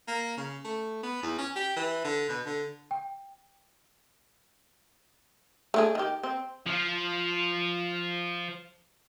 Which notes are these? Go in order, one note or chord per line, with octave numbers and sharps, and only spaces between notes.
A#3
C#3
A3
B3
E2
C#4
G4
E3
D3
B2
D3
G5
A3 D4 G#4
D#3 G4
C4
F3 F4